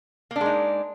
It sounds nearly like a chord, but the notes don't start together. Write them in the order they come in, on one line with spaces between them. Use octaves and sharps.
A#3 D4 G#3 D#4